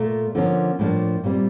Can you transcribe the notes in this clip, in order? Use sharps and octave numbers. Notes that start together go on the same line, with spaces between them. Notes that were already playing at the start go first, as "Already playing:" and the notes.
Already playing: A#2 A3
D3 F3 A#3 C#4
A2 F3 A#3 D4
A#2 G3 C4